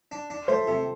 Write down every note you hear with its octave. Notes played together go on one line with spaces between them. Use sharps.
D4
D4
A3 C5
C3 A4